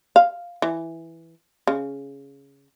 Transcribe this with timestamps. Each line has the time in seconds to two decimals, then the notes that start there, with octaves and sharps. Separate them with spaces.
0.16 F5
0.62 E3
1.67 C#3